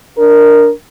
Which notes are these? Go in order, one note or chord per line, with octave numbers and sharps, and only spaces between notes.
D4 A#4